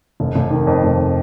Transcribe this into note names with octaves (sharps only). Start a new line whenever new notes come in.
F1
F1
D#3
F2
F1